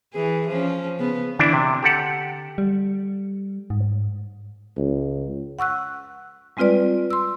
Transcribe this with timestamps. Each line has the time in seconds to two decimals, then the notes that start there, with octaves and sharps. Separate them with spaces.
0.13 E3 G#4
0.48 F3 C#4
0.98 C#3 B3
1.39 D3 E3 D4 E4
1.53 C3
1.83 G4 A4 F#5
2.58 G3
3.70 G#2
4.77 C#2
5.59 F#5 C#6 E6 F#6
6.57 G3 G#3 C4 F4 B4 D5
7.11 C6 E6